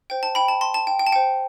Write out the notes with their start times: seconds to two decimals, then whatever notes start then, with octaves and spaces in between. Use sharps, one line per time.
0.10 C5 G5
0.23 A5
0.35 G5 B5
0.48 A5
0.61 A5 C6
0.74 A5
0.87 G5
0.99 G5
1.07 A5
1.12 C5 F#5 G5